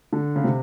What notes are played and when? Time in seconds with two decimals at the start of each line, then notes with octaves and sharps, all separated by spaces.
0.13 D3
0.36 C#3
0.44 C3